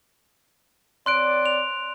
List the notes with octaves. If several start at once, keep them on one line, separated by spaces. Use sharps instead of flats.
C4 C#5 D5 C6 F#6 D7
F7